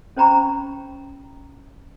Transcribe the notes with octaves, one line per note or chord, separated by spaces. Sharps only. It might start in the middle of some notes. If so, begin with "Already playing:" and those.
C#4 C5 G5 A#5 B5 C#6